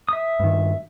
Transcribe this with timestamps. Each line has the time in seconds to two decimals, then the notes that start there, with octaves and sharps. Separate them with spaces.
0.09 E5 D#6
0.40 G2 D#3